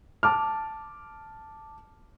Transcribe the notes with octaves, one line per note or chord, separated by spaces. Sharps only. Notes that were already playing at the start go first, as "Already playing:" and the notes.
A5 D6 F6